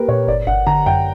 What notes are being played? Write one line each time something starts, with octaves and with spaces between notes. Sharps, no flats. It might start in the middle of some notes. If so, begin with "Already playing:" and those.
Already playing: A#3 G4 A#4 B4
A#2 C#5
G1 D5
G1 F#5
D3 A#5
F#2 G5